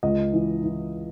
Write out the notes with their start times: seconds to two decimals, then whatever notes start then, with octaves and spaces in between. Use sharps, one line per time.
0.03 C#2 D#5
0.33 E3
0.64 E3